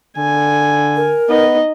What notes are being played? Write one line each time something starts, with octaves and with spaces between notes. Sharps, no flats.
D3 G#5
A#4
B3 D#4 D#5